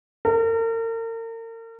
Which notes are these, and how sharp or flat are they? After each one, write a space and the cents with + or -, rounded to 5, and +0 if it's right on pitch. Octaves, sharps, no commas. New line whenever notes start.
A#4 -40